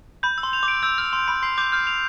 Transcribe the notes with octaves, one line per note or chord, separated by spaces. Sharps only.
B5 G6
E6
C6
F7
D6
D7
E6 G6
E6 F6
C6 F7
B5 D7
C6 C7
D6 G6
F6 G6
F7